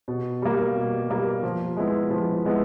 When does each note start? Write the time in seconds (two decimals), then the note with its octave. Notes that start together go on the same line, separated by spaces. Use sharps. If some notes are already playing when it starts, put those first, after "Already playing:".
0.08 B2
0.42 G3 A#3
0.76 B2
1.10 G3 A#3
1.43 F3
1.77 G#3 B3 E4
2.10 F3
2.45 G#3 B3 E4